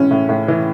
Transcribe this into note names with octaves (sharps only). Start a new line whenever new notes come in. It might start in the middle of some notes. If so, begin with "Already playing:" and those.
Already playing: A2 E3 G#3 C#4
A2
A2
E3